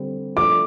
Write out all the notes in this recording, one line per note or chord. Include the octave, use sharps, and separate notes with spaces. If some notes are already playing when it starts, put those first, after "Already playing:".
Already playing: D3 G3 C4
F3 A3 D4 D6